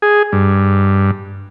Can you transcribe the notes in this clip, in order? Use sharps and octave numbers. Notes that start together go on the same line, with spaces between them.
G#4
G2